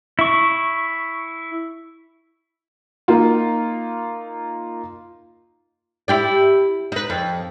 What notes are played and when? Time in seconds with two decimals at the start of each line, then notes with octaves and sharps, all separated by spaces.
0.19 E4 C#6
3.08 A#3 D#4 F4
6.08 E4 G4 D5
6.92 D#4 B4
7.10 F2